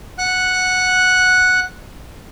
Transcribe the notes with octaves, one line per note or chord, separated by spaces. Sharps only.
F#5 F#6